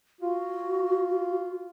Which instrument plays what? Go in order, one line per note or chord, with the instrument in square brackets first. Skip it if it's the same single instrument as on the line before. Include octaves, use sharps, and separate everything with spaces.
[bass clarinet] F4 [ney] F#4